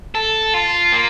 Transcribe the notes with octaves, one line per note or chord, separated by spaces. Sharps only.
A4
F4
A#3